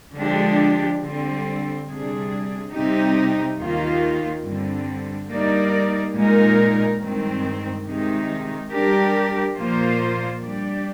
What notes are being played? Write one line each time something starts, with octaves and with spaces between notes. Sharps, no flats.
D3 F3 G#3 D4 G4
D3 G3 C4
C3 G3 D4 G#4
C3 G3 C4 D#4 G4
D#2 D#3 A#3 F4
G2 D3 G3 C4
G3 A#3 D#4 A#4 D5
A#2 G#3 D#4 A#4
G2 D#3 G#3 C4
C3 D#3 G#3 D#4
G3 D4 G4 A#4
A#2 F3 A#3 F4 C5
G3 D4 G4 D5